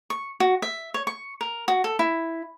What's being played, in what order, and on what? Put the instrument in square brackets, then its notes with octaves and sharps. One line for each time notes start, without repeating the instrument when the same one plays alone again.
[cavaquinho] C#6
F#4
E5
C#5
C#6
A#4
F#4
A4
E4